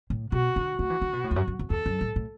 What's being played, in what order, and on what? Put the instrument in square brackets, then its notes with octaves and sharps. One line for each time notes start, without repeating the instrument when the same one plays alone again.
[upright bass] A2
[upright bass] B2 [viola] F#4
[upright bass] D3
[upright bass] A3 [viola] F#4
[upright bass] E3
D3
B2
A2
E2
F#2
F#2
E2
[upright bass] E2 [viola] A4
[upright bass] F#2
A2
A2